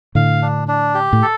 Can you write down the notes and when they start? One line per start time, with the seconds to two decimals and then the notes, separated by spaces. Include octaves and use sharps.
0.15 A2 D3 F5
0.42 D4
0.68 D4
0.95 G4
1.13 A2
1.22 A4